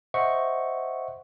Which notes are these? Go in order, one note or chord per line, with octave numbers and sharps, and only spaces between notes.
C5 D#5 E5 F#5 C#6